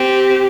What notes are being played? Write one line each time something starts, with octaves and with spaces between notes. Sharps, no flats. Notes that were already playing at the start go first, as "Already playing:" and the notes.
Already playing: C4 G4